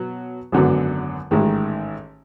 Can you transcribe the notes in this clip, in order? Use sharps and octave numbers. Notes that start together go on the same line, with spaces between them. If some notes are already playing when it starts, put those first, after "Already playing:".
Already playing: B2 F#3 B3
G#1 F#2 D3 F#3 B3
A1 G#2 D#3 G#3